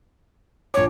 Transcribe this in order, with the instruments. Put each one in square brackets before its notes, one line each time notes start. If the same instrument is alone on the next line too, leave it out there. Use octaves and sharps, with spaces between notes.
[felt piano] A#1 D6 [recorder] C#5